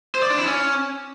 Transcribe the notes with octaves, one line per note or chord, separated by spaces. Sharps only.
C5
D5
D4
E4
C#4